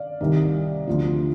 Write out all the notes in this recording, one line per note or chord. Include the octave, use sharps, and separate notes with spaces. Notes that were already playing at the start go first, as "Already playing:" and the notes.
Already playing: D5 F5
C2 C3 D#3
D2 D3 F3